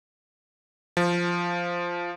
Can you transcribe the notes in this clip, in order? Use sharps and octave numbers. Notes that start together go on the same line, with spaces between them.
F3